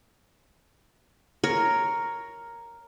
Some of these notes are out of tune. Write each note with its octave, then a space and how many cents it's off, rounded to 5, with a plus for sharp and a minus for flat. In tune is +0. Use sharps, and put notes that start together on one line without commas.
A#4 +0 C#5 +5